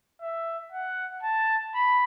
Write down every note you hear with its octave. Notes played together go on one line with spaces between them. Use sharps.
E5
F#5
A5
B5